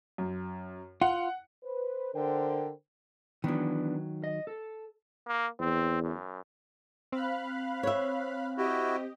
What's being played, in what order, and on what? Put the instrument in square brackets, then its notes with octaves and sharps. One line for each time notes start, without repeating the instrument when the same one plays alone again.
[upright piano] F#2
[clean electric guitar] F4 [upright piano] F#5
[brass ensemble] B4 C5
D3 A#4 C5 G5
[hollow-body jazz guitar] D#3 F#3 [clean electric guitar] E3 B3 D4
[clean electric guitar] D#5
A4
[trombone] A#3
[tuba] E2 [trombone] C4
[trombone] F#2
[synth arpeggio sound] C4 [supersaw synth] F5 B5 F#6
[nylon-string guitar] C#5 E5
[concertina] E4 F#4 [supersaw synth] G4 D#5